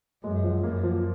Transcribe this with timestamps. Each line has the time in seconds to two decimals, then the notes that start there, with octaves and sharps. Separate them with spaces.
0.23 F#2 G#3
0.43 F3
0.63 F#2 A#3
0.83 F3